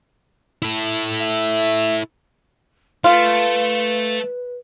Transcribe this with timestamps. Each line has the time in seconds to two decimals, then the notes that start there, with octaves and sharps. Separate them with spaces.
0.62 E4 A4
1.21 E5
3.04 A3 F4 B4